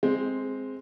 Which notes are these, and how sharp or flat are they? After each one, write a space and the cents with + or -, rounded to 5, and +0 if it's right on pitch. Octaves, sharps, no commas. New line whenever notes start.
G#3 +0 C4 +0